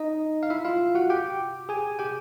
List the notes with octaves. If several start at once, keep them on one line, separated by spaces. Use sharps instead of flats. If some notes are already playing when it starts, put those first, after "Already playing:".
Already playing: D#4 D#5
F5
E4 E5
F4 F5
F#4 F#5
G4 G5
G#4 G#5
G4 G5